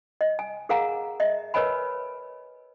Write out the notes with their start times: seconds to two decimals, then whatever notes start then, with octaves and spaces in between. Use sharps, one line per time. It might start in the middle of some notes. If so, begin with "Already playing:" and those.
0.21 D#5
0.39 G#5
0.69 G#4 A#4 F5 F#5 G#5 A#5
1.20 D#5 E5
1.54 A#4 B4 C#5 D#5 G#5 B5